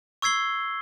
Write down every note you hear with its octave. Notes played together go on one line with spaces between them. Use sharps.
C#6 E6 G#6 C7 G7